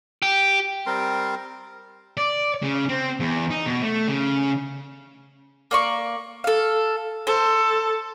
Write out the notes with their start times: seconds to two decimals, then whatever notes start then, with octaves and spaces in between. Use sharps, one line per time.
0.22 G4
0.86 G3 C4 A#4 C6
2.17 D5
2.63 C#3
2.89 C4
3.20 E2
3.50 D#4
3.66 B2
3.82 A3
4.08 C#3
5.71 A#3 D5 C#6
6.44 A4 F5
7.27 A4 C5